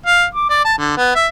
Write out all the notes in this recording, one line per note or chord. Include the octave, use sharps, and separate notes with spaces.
F5
D6
D5
A5
D3
B3
E5